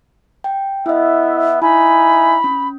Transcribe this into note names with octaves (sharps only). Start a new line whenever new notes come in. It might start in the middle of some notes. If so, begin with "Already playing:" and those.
G5
B3 E4 D#5 E5
D#4 E4 E5 G#5 B5
C#4